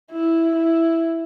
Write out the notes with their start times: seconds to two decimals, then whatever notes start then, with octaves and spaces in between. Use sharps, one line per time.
0.12 E4
0.56 E4